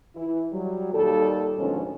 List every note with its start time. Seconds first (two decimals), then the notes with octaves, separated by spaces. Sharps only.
0.16 E3 E4
0.52 F#3 G3
0.93 D#2 A#2 G3 A#3 A4
1.57 D2 G#2 B2 D#3 F3 C#4